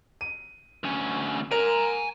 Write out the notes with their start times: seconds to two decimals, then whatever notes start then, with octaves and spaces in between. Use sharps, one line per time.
0.21 D#7
0.84 D2 C#4
1.51 A#4 G#5 A#5